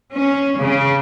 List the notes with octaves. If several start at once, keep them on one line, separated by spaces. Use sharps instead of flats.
C#4
C#3